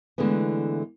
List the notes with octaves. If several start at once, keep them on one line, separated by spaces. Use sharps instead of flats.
D3 E3 G#3 A3 B3